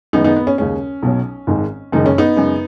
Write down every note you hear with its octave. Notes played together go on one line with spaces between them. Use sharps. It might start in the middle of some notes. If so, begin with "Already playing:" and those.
F#2 D#3 G#3 B3 D#4
B3 D#4
B3
C#4
D#2 C#3 G#3 C#4
B1 B2 F#3
G#1 G#2 D#3 G#3
F#1 F#2 D#3 G#3 D#4
C#4
B3 D#4
F#2 C#3 G#3